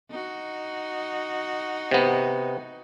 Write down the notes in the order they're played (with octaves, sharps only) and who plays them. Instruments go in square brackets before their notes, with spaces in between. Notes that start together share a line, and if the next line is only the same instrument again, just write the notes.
[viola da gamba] D#4 F#4
[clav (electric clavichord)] C3 B3